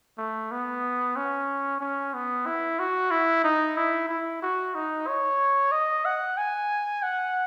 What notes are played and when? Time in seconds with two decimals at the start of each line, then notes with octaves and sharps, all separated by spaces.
0.18 A3
0.51 B3
1.16 C#4
1.81 C#4
2.14 B3
2.46 E4
2.79 F#4
3.11 E4
3.44 D#4
3.77 E4
4.09 E4
4.42 F#4
4.75 D#4
5.08 C#5
5.72 D#5
6.05 F#5
6.38 G#5
7.03 F#5